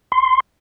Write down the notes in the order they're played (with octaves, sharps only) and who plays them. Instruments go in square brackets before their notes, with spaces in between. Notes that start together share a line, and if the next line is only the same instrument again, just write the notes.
[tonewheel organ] C6